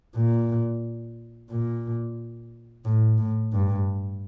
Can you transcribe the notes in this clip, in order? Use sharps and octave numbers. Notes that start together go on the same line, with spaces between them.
A#2
A#2
A2
A2
G2